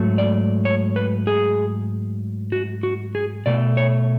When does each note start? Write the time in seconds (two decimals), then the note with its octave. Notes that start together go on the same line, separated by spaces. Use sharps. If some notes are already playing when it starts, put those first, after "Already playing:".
Already playing: G#2 F#3 A3
0.18 D5
0.65 C#5
0.96 B4
1.27 G#4
2.52 F#4
2.83 F#4
3.15 G#4
3.46 B2 A3 D5
3.77 C#5